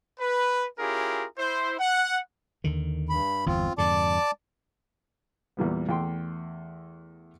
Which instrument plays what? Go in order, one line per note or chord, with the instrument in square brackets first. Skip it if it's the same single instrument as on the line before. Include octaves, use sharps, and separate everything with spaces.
[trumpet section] B4
C#4 E4 F4 G4 G#4 A#4
E4 C5
F#5
[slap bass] D#2 D3 D#3
[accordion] G2 B5
[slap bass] G1 E2 [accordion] C4 F4
[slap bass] F2 G#2 D3 [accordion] D5 A5 D6
[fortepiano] E2 A#2 G3 B3
E2 A3 G5 C6